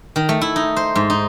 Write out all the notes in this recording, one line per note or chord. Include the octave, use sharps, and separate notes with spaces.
D#3
A3
E4
D#4
C5
G#2
D#4